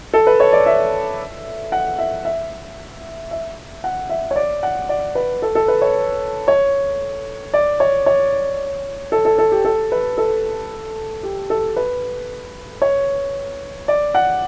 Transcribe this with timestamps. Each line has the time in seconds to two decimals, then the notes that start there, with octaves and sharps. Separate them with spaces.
0.14 A4
0.27 B4
0.40 C#5
0.53 D5
0.66 E5
1.72 F#5
1.99 E5
2.25 E5
3.31 E5
3.84 F#5
4.10 E5
4.31 C#5
4.36 D5
4.63 F#5
4.89 D5
5.15 B4
5.42 A4
5.55 A4
5.68 B4
5.82 C#5
6.48 C#5
7.54 D5
7.80 C#5
8.06 C#5
9.12 A4
9.25 A4
9.39 A4
9.52 G4
9.65 A4
9.92 B4
10.18 A4
11.23 G4
11.50 A4
11.76 B4
12.82 C#5
13.88 D5
14.15 F#5